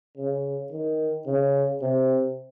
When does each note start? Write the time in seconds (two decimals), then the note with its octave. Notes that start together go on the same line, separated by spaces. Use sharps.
0.17 C#3
0.72 D#3
1.27 C#3
1.82 C3